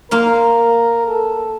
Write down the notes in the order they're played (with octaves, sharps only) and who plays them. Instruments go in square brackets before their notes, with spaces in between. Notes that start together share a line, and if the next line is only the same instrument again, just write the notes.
[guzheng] A#3 F5 C6 [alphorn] A#4
[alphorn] A4